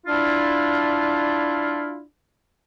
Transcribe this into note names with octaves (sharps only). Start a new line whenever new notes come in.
D4 E4 F4